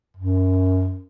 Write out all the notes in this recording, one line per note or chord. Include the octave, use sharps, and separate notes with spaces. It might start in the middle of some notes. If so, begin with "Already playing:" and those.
F#2